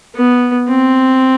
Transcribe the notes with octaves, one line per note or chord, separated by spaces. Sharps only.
B3
C4